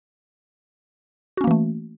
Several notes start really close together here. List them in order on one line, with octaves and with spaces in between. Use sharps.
F#4 C#4 A#3 E3 A3